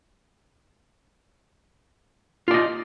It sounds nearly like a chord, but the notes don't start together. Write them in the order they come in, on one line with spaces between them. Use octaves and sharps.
F4 D5 D#5